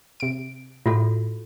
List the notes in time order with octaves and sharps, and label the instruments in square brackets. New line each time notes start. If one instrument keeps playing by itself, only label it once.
[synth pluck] C3 D7
[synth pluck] A2 [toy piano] F4 F#4 A4